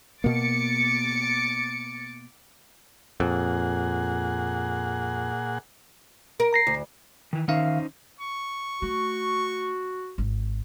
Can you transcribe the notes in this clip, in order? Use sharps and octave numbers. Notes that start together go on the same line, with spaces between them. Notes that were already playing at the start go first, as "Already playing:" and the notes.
B2 A#3 D6 A6 C#7
F2 A#2 G#4 F#5
A#4
A#5 A#6 C7
D2
D#3 E3
D#3 C#4 D#4 C5 E5 F5
C#6
A3 F#4
G#1